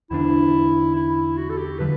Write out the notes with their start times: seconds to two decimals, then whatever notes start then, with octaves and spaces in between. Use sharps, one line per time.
0.11 E2 D3 A3 D4 E4
0.95 E4
1.37 F#4
1.50 A4
1.58 G4
1.79 D3 F#3 B4